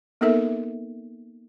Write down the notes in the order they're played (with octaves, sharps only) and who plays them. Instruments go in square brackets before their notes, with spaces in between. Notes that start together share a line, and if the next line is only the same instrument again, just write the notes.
[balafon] A#3 B3 D#4 A4 A#4 E5